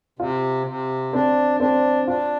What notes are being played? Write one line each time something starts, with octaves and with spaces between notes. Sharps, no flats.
C3 F4
C3
C4 D4
C4 D4
D4 F4